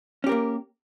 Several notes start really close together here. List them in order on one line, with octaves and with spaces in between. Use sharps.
C#4 G4 A#4 A#3